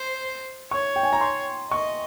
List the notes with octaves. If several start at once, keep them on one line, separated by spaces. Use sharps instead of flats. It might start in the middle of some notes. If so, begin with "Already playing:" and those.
Already playing: C5
C#5 C#6
G5
G#5
A#5
C6
D#5 C#6